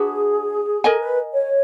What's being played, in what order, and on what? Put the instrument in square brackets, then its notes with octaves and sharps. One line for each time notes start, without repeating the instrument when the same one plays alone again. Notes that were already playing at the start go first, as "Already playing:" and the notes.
Already playing: [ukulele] D4 F#4 B4 [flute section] G#4
[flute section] A4 [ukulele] A#4 D#5 G#5
[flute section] B4
C#5